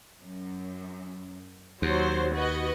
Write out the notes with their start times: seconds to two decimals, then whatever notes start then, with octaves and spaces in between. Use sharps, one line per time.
0.22 F#2
1.82 D#2 F#3 C5
2.35 F#4 B4 D#5